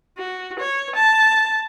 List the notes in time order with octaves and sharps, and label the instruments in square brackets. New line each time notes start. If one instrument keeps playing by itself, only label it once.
[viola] F#4
C#5
A5